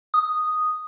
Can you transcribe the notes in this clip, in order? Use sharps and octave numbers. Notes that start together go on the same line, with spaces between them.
D#6